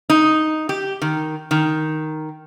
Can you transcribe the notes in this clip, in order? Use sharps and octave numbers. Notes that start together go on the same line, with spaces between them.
D#4
G4
D#3
D#3